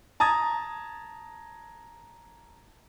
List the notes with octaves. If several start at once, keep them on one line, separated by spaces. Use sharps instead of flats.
A5 A#5 D#6 G#6 A6